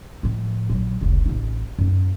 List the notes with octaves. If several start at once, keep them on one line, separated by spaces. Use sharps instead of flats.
A2 F3
A#1 F#3
F1 C#2
A1 D#4
F#2 D#4